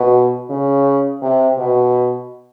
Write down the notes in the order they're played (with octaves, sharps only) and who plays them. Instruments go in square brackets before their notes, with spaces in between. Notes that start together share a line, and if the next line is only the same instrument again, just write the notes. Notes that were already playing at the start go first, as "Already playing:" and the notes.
Already playing: [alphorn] B2
C#3
C3
B2